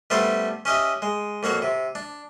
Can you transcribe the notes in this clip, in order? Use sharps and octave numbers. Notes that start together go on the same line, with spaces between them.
G3 A3 B3 D4 G4 C5
C#4 G4 D#5 E5
G#3
F2 A#3 F#4 C#5
C3
D4